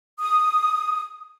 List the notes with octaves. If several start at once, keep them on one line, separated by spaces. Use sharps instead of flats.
D#6